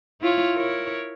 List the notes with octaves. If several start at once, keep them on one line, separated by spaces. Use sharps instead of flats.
E4 F4 C#5
E4 A#4 C#5